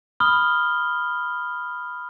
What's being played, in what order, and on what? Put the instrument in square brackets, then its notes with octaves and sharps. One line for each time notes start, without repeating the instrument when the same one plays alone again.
[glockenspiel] B5 D#6 F6 G7